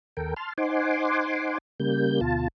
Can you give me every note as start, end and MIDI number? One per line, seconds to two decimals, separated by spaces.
0.17 0.34 39
0.17 0.34 69
0.17 0.34 70
0.17 0.34 79
0.36 0.53 81
0.36 0.53 84
0.36 0.53 89
0.58 1.58 63
0.58 1.58 72
0.58 1.58 78
0.58 1.58 80
0.58 1.58 84
0.58 1.58 86
1.80 2.20 49
1.80 2.20 55
1.80 2.20 58
1.80 2.20 91
2.21 2.48 38
2.21 2.48 47
2.21 2.48 65
2.21 2.48 81